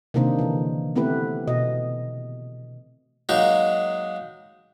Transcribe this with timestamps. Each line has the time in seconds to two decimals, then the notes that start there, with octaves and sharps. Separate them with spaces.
0.14 C3 D#3 A#3 D4 D#4 C5
0.39 D3 E3
0.96 A3 B3 C4 E4 G4 B4
1.47 B2 D#5
3.29 F#3 G#3 A#3 D#4